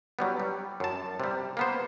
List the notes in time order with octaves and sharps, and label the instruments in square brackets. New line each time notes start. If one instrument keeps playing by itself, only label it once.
[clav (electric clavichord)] F#3 G3 B3
G3
F#2 A5
C3 G3
A#3 B3 C5